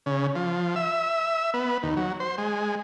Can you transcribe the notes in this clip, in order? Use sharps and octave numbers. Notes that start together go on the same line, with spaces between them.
C#3
F3
E5
B3
D#2
F#3
C5
G#3